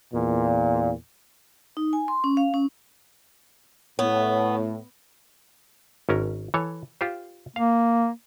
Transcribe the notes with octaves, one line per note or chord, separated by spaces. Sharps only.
E2 A#2
D#4
G#5
C6
C#4
F5
C#4
A2 B3 C#5
G#1 C#4 A#4
E3 A4 C#5
F4 G4 C5
A#3 F5